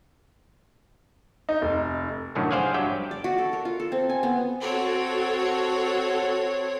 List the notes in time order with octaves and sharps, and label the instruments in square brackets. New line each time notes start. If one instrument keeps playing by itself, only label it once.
[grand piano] D#4
F1
[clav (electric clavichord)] C2 F#2 A2 D3 D#3 F#3
G#4 C5 D5 F5 F#5 G#5
G2 F#3 G4 E5 G5
[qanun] D5
F#4
A4
A#4
F4
A4
C4
G#5
B3
[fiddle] C4 C#5 [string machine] F#4 A4